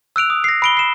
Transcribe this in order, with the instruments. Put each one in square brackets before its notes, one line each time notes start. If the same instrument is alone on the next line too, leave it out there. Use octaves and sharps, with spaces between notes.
[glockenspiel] E6 F#6 D7 F7
D#6
A#6 C7
B5 D7 G7
C7 E7